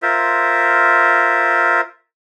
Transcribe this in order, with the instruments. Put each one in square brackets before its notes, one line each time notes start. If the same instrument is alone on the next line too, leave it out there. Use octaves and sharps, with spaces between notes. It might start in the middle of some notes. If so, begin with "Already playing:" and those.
[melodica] F4 A#4 C5 E5